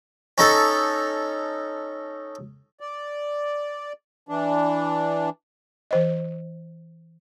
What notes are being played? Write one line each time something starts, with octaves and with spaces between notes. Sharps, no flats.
C#4 D#4 A4
D5
E3 D4
E3 C5 D#5